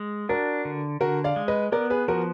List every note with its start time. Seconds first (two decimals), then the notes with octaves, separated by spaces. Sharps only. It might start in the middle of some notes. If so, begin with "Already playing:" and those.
Already playing: G#3
0.29 D4 F#4 A#4
0.65 D3
1.00 D3 F#4 A#4
1.24 D5 F5
1.36 G#3
1.48 B4 D#5
1.72 B3 A#4 D5
1.90 G#4 B4
2.08 F3 F#4 A#4